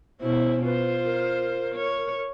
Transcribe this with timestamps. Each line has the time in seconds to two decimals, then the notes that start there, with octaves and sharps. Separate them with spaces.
0.21 B2 C#4 E4 C5
0.65 F4 B4 C5
1.05 A#4
1.75 C#5